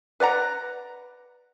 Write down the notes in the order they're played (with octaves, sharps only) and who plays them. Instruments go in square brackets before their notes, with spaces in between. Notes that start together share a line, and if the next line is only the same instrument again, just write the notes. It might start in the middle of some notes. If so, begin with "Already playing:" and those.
[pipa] B4 D5 F#5 A#5